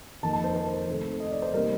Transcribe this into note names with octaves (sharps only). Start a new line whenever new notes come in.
F2 D#3 A#3 D#4 A5
A5
C5
C5
C3 D#3 A3
D#5
D5
C5
C3 G3 A#3 D#4 A#4